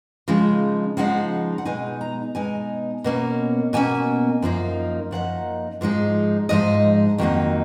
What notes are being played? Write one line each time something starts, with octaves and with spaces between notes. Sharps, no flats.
C#3 F3 G#3 D#4
C#3 F3 G#3 D#4 F#5
F#5
B2 G#3 D#4 G#5
A#5
B2 G#3 D#4 G#5
B2 A#3 C#4
B2 A#3 C#4 G#5
F#2 F3 A#3 D#4
F#2 F3 A#3 D#4 F#5
G#2 F3 G#3 D#4
G#2 F3 G#3 D#4 D#5
F2 D#3 F#3 A#3 D#4